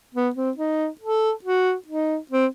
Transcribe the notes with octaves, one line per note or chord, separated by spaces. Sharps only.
B3
C4
D#4
A4
F#4
D#4
C4